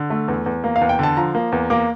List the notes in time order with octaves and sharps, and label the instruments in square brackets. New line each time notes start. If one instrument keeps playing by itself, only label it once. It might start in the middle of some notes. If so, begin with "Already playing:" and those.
Already playing: [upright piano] D3
A3
E2
E2
A#3
F5
E2
G5
D3 A5
F3 A#5
A#3
E2
A#3 D6